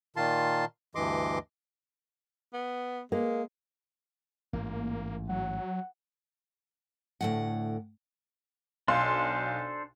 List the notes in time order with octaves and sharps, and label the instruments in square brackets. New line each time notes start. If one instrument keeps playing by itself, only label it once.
[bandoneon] A#2 D#3 F4 A5 C6
D2 G2 E3 D#5 C6 D6
[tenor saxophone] B3
[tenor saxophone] G#3 [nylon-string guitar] A#3
[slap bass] A1 G#2 [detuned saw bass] A#3
[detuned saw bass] F#3 [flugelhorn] F#5
[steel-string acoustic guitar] D2 A2 F#5
[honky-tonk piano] B1 F5 C6 [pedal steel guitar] D4 A4 C5